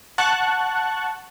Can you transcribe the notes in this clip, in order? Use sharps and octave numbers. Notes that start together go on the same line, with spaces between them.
F#5 A5 C#6 F#6